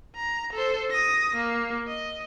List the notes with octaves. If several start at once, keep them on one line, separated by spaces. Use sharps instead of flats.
A#5
A4 C5
D#6 A#6
A#3
D#5